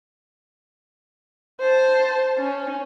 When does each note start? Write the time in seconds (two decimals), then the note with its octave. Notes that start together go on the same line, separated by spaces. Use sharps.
1.60 C5 A5
2.38 C#4